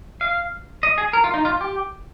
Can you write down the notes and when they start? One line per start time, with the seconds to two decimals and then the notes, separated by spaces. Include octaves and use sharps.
0.21 F5
0.83 D#5
0.98 G#4
1.13 A#4
1.24 F4
1.34 D#4
1.45 F4
1.61 G4